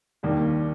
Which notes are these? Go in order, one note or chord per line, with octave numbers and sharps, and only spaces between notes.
D#2 D#3 G3 A#3 D4